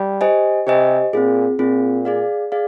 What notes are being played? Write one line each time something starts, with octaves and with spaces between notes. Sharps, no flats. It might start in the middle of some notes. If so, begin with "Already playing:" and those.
Already playing: G3
G4 C5 D#5 G#5
C3 G4 C5 D#5 G#5
A#2 C4 F4 G#4
A#2 C4 F4 G#4
G#4 D5 F5
G#4 D5 F5